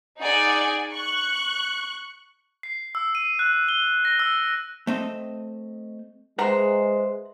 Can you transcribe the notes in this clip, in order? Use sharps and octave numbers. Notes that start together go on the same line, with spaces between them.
D#4 G#4 D5 F#5 G#5
C#6 F#6
C7
E6
D#7
F#6
G7
A#6
E6
A3 C4 D#5
G#3 G#4 B4 C5 E5 F#5 A#5 C6